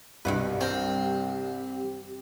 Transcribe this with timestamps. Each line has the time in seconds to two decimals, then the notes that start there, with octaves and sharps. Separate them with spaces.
0.25 C2 G2 B2 B4
0.61 C4 A#4
1.04 G4